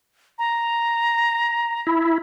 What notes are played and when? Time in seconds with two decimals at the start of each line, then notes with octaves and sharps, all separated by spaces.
0.39 A#5
1.87 E4